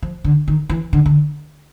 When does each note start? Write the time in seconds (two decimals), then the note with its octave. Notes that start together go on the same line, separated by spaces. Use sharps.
0.02 F3
0.24 D3
0.48 D#3
0.69 E3
0.93 D3
1.06 D3